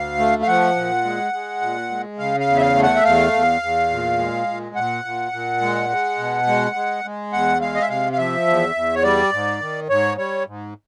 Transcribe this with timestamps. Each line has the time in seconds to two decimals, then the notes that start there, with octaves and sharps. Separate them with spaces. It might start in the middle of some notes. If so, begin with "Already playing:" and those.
Already playing: D2 F5
0.19 A3
0.42 F5
0.47 F3 F#5
0.76 A#2
1.05 G#3
1.33 G#3
1.61 A#2
1.91 G#3
2.18 C#3 F5
2.40 F5
2.47 E2
2.57 E5
2.61 F5
2.75 A3
2.83 F#5
2.96 E5
3.04 E2 F5
3.33 E2
3.62 E2
3.90 A#2
4.19 G#3
4.47 A#2
4.75 A#2 F#5
5.04 A#2
5.32 A#2
5.61 G#3
5.90 G#3
6.18 B2
6.47 G#3
6.75 G#3
7.04 G#3
7.33 E2 F#5
7.61 G#3 F5
7.74 D#5
7.81 E5
7.89 C3 F5
8.13 F5
8.18 F3 E5
8.47 E2
8.75 E2
8.94 C#5
9.03 G3 D5
9.33 G#2
9.61 D#3
9.89 G#2 C#5
10.17 G3 C#5
10.47 G#2